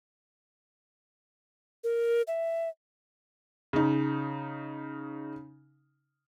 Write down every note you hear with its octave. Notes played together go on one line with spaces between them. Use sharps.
A#4
E5
C#3 D#4